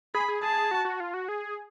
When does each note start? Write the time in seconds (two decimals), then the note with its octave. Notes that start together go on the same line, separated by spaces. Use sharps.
0.15 G#4 B5
0.28 G#4
0.43 G#4 A5
0.71 F#4
0.85 F#4
1.00 F4
1.14 F#4
1.28 G#4